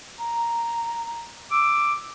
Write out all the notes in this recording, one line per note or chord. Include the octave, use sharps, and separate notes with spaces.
A#5
D6 E6